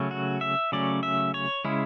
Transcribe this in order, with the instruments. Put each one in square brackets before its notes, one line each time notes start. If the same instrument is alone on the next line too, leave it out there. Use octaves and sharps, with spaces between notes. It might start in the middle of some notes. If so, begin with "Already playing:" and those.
Already playing: [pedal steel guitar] C#3 F#3 A3 C#4
F#4
E5
C#3 F#3 A3 C#4 D5
E5
C#5
C#3 G#3 C#4 E4